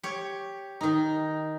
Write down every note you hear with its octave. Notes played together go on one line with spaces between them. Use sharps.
G4 C#5
D#3 D#4